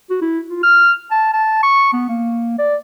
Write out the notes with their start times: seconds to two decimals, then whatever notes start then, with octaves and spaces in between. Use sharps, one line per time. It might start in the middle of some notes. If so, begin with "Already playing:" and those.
0.10 F#4
0.22 E4
0.49 F4
0.63 F6
1.11 A5
1.33 A5
1.63 C#6
1.93 B3
2.09 A#3
2.59 D5